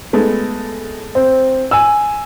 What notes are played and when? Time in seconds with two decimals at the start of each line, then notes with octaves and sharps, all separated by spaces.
0.13 G#3 A3 B3
1.15 C4
1.71 G#5 E6